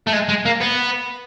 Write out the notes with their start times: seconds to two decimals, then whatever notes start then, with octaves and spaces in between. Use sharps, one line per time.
0.07 A3
0.13 G#3
0.29 G#3
0.46 A#3
0.61 B3